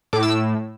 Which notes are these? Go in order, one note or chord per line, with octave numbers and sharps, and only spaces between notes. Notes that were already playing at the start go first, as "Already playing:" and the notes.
A2 D6
E6